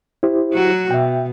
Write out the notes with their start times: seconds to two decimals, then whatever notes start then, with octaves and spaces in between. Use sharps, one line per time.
0.23 E4 G4 C5
0.53 F#3 F#4
0.91 B2 E5 G5